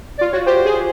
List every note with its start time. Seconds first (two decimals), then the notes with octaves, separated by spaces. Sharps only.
0.18 D5
0.21 F4
0.32 F#4 C#5
0.46 G4 C5
0.65 G#4